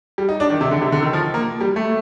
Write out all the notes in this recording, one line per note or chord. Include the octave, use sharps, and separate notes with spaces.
G3
D#4
D4
D#3
C3
D3
C3
D3
D#3
F3
A#3
G3
A3